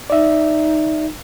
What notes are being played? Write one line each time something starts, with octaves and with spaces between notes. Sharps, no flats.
D#4 D5 E5